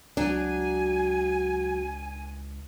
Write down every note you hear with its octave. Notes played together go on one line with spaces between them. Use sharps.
C#2 F#3 D4 G#5